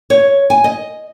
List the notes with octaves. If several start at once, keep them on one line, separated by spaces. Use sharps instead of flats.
C#5
G#5
D#5